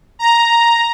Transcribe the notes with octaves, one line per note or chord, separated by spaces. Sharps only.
A#5